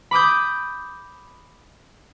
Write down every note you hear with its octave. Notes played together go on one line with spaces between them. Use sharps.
B5 D6 D#6 G6